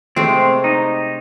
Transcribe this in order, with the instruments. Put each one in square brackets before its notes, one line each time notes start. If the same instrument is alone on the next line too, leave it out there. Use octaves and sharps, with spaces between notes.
[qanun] C3 G#3 A3 [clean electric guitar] C4
[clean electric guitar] D#4